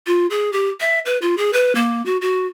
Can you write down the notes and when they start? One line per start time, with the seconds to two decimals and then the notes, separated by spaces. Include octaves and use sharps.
0.07 F4
0.30 G#4
0.52 G4
0.80 E5
1.06 B4
1.22 F4
1.37 G#4
1.53 B4
1.75 A#3
2.06 F#4
2.21 F#4